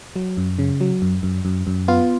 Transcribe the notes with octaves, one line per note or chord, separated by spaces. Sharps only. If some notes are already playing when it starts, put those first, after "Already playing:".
F#3
F#2
C#3
F#3
F#2
F#2
F#2
F#2
B3 F4